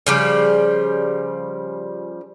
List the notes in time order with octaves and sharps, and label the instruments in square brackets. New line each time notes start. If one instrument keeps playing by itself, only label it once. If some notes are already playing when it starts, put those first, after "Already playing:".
[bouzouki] C#3 F3 G3